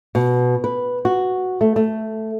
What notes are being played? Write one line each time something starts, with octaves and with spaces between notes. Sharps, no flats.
B2
B4
F#4
A3
A3